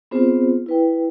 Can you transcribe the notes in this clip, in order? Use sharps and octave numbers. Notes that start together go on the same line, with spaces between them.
B3 C4 F4 G#4 C5
E4 B4 G5